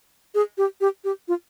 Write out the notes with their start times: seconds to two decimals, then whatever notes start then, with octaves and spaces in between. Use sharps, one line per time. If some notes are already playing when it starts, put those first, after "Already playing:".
0.35 G#4
0.58 G4
0.81 G4
1.04 G4
1.28 F4